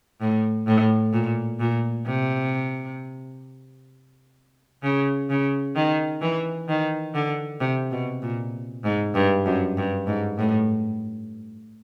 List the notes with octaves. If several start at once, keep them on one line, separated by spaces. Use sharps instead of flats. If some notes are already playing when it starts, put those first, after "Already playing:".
A2
A2
A#2
A#2
C3
C#3
C#3
D#3
E3
D#3
D3
C3
B2
A#2
G#2
G2
F#2
G2
G#2
A2